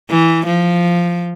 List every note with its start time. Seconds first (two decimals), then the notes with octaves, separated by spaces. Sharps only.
0.10 E3
0.46 F3